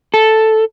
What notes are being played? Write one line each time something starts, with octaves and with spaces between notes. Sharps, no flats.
A4